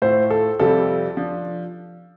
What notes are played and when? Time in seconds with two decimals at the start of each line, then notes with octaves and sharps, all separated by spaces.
0.02 A2 A3 F4 C5
0.30 A4
0.59 F2 C3 G3 C4 F4 A4
1.17 F3 D4